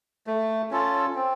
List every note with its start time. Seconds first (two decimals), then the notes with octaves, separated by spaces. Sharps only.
0.27 A3
0.71 C#4 F4 A4
1.15 C4